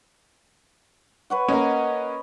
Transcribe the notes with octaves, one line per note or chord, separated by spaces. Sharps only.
B4 C#5 F#5
A#3 C#4 D#5